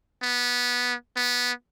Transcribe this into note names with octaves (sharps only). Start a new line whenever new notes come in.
B3
B3